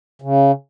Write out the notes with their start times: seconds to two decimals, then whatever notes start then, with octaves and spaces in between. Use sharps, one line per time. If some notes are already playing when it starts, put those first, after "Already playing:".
0.22 C#3